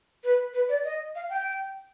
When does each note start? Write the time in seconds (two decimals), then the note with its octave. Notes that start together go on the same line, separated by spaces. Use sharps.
0.24 B4
0.54 B4
0.69 D5
0.84 D#5
1.15 F5
1.30 G5